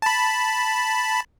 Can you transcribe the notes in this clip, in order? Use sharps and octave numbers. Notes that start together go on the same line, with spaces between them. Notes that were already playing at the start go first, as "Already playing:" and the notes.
A5 B5